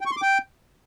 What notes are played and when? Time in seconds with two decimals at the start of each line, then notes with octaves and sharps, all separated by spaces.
0.01 G5
0.06 C#6
0.11 C6
0.17 D6
0.22 G5